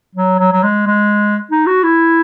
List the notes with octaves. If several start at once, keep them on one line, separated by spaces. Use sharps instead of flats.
F#3
F#3
F#3
G#3
G#3
D#4
F#4
E4